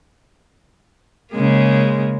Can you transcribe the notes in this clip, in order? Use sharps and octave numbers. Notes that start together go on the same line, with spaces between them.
C#3 G#3 A#3